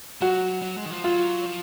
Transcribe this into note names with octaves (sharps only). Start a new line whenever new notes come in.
F#3 F#4
F#3
G#3
D#3
F3
F#3 F4
F3